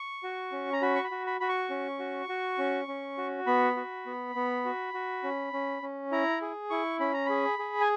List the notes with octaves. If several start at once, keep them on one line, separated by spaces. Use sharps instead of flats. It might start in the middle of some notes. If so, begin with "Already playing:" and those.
Already playing: C#6
F#4
C#4
A#5
F#4 B5
C#6
B5
F#4
B5
F#4 B5
C#6
C#4
F#4
F#4
C#4
C#4
F#4
B3 B5
F#4
B3
B3
F#4
F#4
C#4
C#4
C#4
E4 A#5
G#4
E4 C#6
C#4 B5
A#5
G#4 B5
G#4
G#5